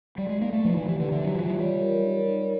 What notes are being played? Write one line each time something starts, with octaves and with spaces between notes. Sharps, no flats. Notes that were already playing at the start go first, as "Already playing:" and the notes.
G3 D5
G#3
A#3 D#4
A3
F3 B4
E3
E3 G4
D3
D3 E5
F#3
E3 F4
F#3
G3 C#5
A#4
D#4
D#4